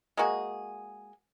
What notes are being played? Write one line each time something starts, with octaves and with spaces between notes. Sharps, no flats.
G#3 A#3 F#4 G#4